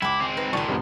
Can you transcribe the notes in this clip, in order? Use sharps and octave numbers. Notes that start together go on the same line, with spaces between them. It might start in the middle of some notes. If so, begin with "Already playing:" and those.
C#2 E4 B5 D6
G#3 C4
D#4 B4
C#2 A#2 D#3 D5 A5 C6 C#6
C2 G2 B3